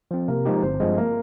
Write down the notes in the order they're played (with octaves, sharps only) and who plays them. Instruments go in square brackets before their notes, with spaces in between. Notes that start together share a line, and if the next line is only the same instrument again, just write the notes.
[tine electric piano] F3 C4
[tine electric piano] C3 [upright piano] A#3 A#4
[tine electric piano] F3 G#3 D#4 G4
[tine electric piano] G1 [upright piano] C4 C5
[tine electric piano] G2 F3 G#3
[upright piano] A#3 A#4